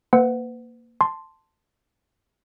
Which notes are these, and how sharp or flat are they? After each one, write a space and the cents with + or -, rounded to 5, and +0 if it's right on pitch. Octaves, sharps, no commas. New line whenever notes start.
A#3 +0 B4 +40 F#5 +0
A5 +10 C6 +0